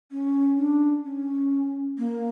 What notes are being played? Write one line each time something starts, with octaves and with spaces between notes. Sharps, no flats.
C#4
D4
C#4
A#3